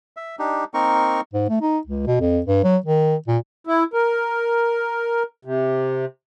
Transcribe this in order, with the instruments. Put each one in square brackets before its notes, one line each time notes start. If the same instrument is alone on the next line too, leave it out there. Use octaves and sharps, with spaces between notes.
[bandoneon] E5
D4 D#4 G4
A#3 C4 D#4 A#4 C#6
[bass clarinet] G#2
A3
D#4
C#2
B2
F2
G2
F#3
D#3
A#2
[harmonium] E4
A#4
C3